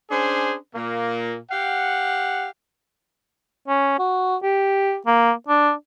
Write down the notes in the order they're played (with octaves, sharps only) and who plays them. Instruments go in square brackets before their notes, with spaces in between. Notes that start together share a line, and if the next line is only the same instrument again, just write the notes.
[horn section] C#4 D4 G#4 C5
A#2 A#3
G4 F5 F#5
[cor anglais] C#4
F#4
G4
A#3
D4